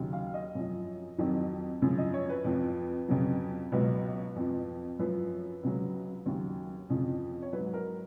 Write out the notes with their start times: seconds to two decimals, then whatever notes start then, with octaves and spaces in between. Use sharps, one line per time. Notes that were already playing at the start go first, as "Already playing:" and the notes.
Already playing: D#2 C#3 F#3
0.13 F5
0.34 D#5
0.55 F#2 F3
1.18 F2 D#3 F#3
1.82 F#2 C#3 F3
1.98 D#5
2.14 C#5
2.29 B4
2.45 F2 F3
3.08 F2 C#3 F#3
3.72 C#2 B2 F#3 B4
4.36 F2 F3
4.99 F#2 F3 B4
5.63 C#2 C#3 F#3
6.26 D#2 C#3 F#3
6.90 F2 C#3 F3
7.42 C#5
7.53 G#2 F#3 B4
7.73 A#4